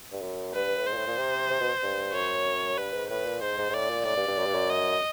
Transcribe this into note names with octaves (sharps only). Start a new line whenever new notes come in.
G2
F#2
G2 B4
A2
G#2 C5
A#2
A2
A#2
C3
C3
B2
G2
F#2 C#5
G2 B4
G#2
A2 B4
A#2
G#2 C5
G#2
G#2
A2 D5
A#2
A2 D5
G2
G2
F#2
G2
F#2
D#5